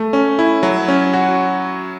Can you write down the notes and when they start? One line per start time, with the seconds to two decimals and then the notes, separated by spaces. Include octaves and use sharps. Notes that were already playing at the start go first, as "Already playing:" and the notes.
Already playing: A3
0.13 C#4
0.39 E4
0.63 F#3
0.88 C#4
1.14 F#4